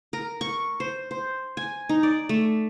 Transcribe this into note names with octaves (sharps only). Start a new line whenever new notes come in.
A#4
C#6
C5
C5
G#5
D#4
D5
A3